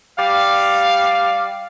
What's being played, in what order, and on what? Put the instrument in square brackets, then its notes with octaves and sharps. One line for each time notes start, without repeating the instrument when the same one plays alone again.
[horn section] G3 D5 F5